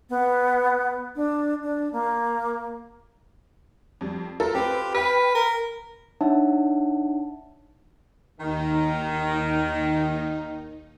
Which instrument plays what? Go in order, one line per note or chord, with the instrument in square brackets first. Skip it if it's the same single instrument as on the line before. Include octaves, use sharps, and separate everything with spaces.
[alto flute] B3
D4
D4
A#3
[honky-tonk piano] F2 G3
F4 A4 A#4
[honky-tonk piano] C4 F4 B4 [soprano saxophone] G4
[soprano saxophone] B4 [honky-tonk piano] G5 F6
[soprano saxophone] A#4
[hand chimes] D4 D#4 C#5 E5 F#5 A5
[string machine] D#2 D#4 [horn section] D#3